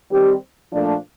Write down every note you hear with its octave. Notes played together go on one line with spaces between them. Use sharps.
D#3 G3 C4 G4
A#2 F3 A3 D4